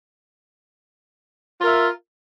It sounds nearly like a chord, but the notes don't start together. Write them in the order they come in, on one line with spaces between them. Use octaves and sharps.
F4 A#4 E5